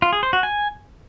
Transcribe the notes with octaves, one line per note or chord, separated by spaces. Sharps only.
F4
G#4
C5
F#4
G#5